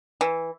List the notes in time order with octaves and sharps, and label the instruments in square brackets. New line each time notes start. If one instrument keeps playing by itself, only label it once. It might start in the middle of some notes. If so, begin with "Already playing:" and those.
[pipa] E3